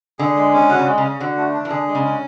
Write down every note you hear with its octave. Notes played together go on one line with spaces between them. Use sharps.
D3 G#4
G#3
C#4
D3 F#4
C#3
G#3
C#3
C#4
D3 F#4
A3
D4
E3
D3 G#4
G#3
C#3
C#4